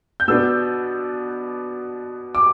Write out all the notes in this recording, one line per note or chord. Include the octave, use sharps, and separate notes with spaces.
G6
B2 B3 D4 E6
D6